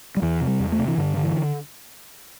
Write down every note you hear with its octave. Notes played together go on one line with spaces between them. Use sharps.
G3
E2 E3
C3
G3
E2
A3
C3
E3
G2 D3
D3
E3